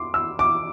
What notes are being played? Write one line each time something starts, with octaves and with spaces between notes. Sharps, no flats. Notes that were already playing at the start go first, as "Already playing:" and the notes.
Already playing: C6 D6
E6
D6